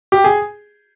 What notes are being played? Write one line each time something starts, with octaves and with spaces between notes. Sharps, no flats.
G4
G#4